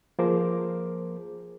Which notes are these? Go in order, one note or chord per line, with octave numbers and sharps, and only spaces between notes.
F3 A#3 G#4 A#4 C5 D6